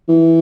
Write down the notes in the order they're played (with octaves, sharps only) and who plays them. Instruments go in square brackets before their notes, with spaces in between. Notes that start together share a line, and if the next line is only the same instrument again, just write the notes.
[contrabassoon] E3